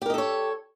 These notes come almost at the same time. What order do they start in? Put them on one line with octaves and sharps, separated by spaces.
G4 A#4 D#5 A4 C#5